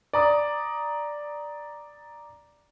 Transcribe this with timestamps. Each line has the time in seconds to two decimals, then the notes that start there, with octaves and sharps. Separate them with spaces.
0.13 D5 A#5 D#6